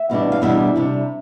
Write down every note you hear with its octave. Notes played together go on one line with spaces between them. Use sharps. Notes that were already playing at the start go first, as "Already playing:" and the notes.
Already playing: E5
E2 B2 G3 D4
F5
E2 B2 G3 D4 E5
C3 G3 D4